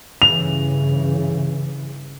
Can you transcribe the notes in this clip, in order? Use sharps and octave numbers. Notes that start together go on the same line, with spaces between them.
G2 C#3 E3 F7